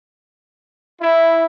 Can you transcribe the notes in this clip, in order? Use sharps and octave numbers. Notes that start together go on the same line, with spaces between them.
E4 E5